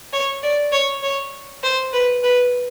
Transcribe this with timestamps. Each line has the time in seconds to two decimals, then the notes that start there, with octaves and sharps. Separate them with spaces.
0.13 C#5
0.43 D5
0.72 C#5
1.03 C#5
1.64 C5
1.93 B4
2.23 B4